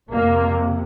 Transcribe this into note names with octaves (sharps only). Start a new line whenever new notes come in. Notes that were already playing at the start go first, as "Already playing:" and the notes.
F2 C3 A#3